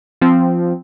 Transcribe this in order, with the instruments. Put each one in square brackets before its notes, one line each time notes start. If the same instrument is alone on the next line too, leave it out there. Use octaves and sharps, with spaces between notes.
[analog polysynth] F3 C4